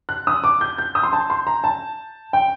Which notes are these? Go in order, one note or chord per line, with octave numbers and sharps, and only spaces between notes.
F#6
D#6
D6
G6
G6
D#6
C6
A5
C6
A#5
A5
G5